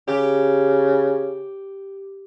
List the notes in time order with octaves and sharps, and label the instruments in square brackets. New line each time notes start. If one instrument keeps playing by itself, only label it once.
[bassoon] C#3 [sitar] G4